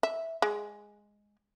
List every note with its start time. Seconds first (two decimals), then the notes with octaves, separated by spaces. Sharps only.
0.03 E5
0.42 G#3